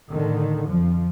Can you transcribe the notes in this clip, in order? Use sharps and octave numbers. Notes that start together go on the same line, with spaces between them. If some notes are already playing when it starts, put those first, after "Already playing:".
A2 D3 D#3
F2 F3